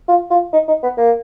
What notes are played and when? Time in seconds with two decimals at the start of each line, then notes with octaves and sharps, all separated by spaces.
0.08 F4
0.30 F4
0.53 D#4
0.68 D#4
0.83 B3
0.97 A#3